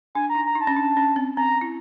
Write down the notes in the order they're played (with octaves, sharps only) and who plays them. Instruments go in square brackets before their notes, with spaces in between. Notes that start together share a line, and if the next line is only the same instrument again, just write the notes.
[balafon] D4 [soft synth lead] G#5
[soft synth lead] A#5
[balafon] D#4
[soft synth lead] A#5
[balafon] D#4
[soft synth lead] A5
[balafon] C#4
D4
C#4
C4
[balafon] C4 [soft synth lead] A#5
[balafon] E4